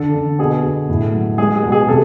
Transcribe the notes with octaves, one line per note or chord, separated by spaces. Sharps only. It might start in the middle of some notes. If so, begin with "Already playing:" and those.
Already playing: D3 A4
D3
B2 G#4
B2
A2
F#3
G#3 G#4
G#4
B2
G#4
C3 A4